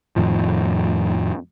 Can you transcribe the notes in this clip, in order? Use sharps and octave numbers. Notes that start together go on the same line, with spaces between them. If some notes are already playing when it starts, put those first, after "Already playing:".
F2 A2 D#3 F3